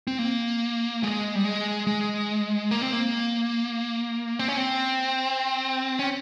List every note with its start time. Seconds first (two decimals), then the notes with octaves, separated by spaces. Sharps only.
0.07 C4
0.19 A#3
1.03 G#3
1.35 G3
1.44 G#3
1.87 G#3
2.71 A#3
2.82 C4
2.93 A#3
4.39 C4
4.48 C#4
4.57 C4
5.99 C#4